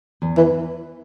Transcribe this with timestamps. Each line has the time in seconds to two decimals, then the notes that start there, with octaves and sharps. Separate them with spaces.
0.22 E2
0.37 E3